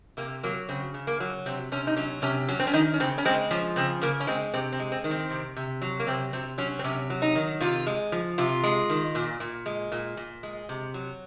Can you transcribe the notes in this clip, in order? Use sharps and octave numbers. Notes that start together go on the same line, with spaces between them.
C3 A#3
F#3 A#3
C#3 C4
C#3
A#3
F#3
C3 C4
C3 C#4
D#4
F#3 C#4
C3 C#4
F#3 C#4
C4
C#4
D#3 D#4
C#4
C#3 C4
C#4
G#3 C4
F3 C#4
C#3 C4
C#3 A#3
C#4
G#3 C4
C3 C4
C4
G#3
C4
D#3
C4
C3
C3
F#3
A#3
C3 C4
C3 C4
F#3 C#4
C4
C3 C#4
F#3
D#4
D#3
C3 F4
G#3
F3
C3 F4
G#3
D#3
A#2
A#2
G#3
A#2
A#2
G#3
C3
F#3